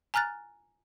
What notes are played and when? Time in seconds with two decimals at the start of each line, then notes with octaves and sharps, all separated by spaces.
0.14 G#5 A#5 F6 F#6 A6